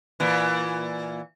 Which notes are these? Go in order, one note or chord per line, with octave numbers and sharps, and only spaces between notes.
A#2 E3